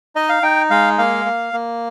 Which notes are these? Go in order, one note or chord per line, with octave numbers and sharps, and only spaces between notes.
D#4 D#5
F5
D#4 G5
G#3 F5
A#3 F5
A#3
A#3